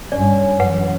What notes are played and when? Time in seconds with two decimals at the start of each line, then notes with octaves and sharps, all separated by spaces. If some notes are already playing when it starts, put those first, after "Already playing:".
0.12 G2 C#4 D5
0.60 F#2 E3 B4 F#5